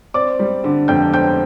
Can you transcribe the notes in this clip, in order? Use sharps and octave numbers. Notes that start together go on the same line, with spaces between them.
C4 D5 D6
G3
D3
F2 G5 G6
C4 G5 G6